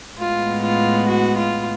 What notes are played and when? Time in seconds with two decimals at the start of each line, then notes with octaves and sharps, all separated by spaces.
0.17 A2 G#3 B3 F4
0.62 F4
1.07 F#4
1.37 F4